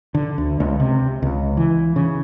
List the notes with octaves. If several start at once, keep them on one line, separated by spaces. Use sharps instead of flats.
D3
D2
C#2
C3
C#2
E3
C#3